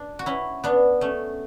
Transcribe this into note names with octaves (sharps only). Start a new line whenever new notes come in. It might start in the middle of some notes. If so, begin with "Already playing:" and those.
Already playing: D4
F#4
C#4 E4
B3 D4
A3 C#4